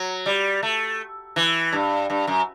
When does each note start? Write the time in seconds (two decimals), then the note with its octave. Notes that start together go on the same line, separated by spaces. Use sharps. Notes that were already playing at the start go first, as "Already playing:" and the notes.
Already playing: F#3
0.26 G3
0.63 A3
1.36 E3
1.73 G2
2.10 G2
2.28 F#2